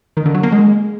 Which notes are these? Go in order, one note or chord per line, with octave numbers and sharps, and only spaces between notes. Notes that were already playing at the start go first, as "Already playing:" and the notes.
D#3
D3
F#3
A#3
G#3